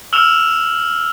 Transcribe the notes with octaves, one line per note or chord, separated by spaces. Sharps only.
E6 F6 E7 F7